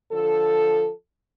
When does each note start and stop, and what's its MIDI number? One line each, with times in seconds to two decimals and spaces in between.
0.12 0.90 50
0.12 0.90 53
0.12 0.90 69